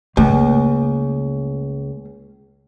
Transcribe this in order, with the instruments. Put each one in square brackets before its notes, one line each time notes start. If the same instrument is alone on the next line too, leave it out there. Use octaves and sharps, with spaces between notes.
[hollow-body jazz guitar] C#2 [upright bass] A3 A#3